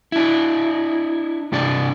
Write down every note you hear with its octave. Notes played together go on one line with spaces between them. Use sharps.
D4 E4
G2 C3 D4 D5